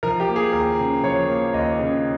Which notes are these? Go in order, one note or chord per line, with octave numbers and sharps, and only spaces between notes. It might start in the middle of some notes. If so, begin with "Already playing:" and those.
F3 A#4
G4
A#3
G#4
D#2 A#4
C#3
F3 C#5
A#3
D#2 D#5
C#3